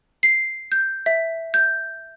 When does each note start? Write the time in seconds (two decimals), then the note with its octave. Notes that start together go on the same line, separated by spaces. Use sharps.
0.23 C7
0.72 G6
1.06 E5
1.54 G6